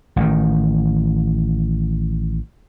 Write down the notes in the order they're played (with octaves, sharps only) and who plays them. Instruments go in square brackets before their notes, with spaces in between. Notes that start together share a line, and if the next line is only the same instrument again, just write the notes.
[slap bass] A1 D#3